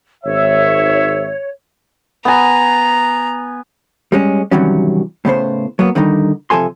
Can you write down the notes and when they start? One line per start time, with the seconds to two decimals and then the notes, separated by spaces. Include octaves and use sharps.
0.24 G#1 C#5 E5
2.25 B3 G#5 A#5
4.12 G3 G#3 C#4
4.51 C3 D#3 E3 F#3 G3 C#4
5.25 A2 C#3 B3 C5
5.79 F#3 A#3 B3
5.95 D3 D#3 G3 D#4
6.50 C3 F3 A4 G#5 C6